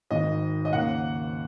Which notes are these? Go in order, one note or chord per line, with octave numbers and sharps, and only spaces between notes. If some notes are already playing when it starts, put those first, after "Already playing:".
G#1 G#2 D#3 D#5
D#5
D#2 C#3 A#3 F#5